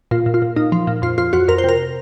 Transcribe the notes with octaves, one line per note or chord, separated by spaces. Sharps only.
A#2 F4
A#2
F4
A#2
A#2 D#4
F3
A#2
F2 F4
F2 F4
F2 F#4
F2 A#4
C5
C3 A#4